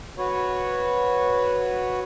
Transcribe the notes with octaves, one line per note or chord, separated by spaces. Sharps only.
F#4 B4 C#5